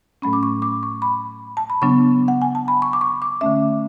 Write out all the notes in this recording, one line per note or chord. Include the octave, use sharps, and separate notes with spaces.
A2 F#3 A3 C#4 B5
D6
C#6
D6
C#6
B5
A5
B5
C#3 F#3 B3 D4 C#6
F#5
G#5
A5
B5
C#6
D6
C#6
D6
D3 A3 C#4 E5